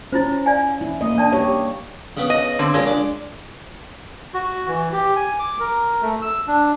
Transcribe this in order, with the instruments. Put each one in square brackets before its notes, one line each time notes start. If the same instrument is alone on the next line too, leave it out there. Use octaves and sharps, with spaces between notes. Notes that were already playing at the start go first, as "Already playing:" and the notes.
[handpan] C#4 [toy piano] E4 F4 C5
[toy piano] D5 F5 G#5
[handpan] E4
A#3 D#5
[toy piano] D4 D5 A5
[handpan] G4 C#5
[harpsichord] C#3 B3
[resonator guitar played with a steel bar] D#5
D3 C4
[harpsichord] A#2 C#3 [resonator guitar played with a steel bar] G#3
[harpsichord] D4
[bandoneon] F#4
E3
G4
G#5
D6
A#4
A3
E6
D4